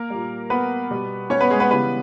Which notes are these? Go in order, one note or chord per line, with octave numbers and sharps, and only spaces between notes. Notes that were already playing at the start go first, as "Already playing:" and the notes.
Already playing: A#3 A#4
A#2 G3
B3 B4
B2 G3
C#4 C#5
B3 B4
G#3 G#4
B3 B4
C#3 E3 G3 B3 B4